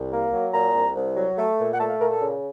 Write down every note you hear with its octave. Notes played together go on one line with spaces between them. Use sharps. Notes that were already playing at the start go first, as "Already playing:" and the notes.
Already playing: C2
A#3
F#3
A#2 A#5
C2
C2
F#3
A3
A#2
F#5
A3 A5
F5
A#2 A#4
A4
C#3